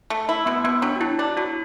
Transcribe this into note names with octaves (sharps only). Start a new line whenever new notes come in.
A3
E4
B2 B3
B2 B3
F#3 D4
F#4
F#3 E4
D4 E4
F#3 F#4